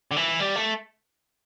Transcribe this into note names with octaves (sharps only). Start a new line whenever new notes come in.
D3
E3
G3
A3